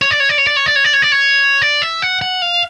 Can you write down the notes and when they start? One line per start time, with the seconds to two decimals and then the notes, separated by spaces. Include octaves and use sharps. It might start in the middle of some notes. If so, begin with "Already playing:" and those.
0.02 C#5
0.11 D5
0.20 C#5
0.29 D5
0.38 C#5
0.47 D5
0.56 C#5
0.66 D5
0.76 C#5
0.84 D5
0.93 C#5
1.02 D5
1.12 C#5
1.62 D5
1.82 E5
2.02 F#5
2.22 F#5
2.42 F5